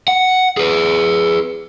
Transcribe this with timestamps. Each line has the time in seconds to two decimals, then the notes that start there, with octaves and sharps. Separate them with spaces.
0.08 F#5
0.57 G#4 B4